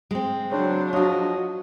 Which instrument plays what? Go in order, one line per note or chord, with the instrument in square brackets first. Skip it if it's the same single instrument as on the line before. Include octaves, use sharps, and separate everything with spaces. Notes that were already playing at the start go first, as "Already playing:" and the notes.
[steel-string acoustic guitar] G#3 C4
[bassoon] C#3 [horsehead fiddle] F#3 D4 [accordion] C5
[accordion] F3 D#5 [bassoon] C#4 [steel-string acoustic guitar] F4 F#4